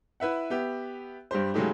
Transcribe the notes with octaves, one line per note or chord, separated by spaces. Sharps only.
E4 B4 E5 F#5
B3 G4 E5
G2 G3 G4 C5
C#3 F#3 G#3 A3 D#4 G4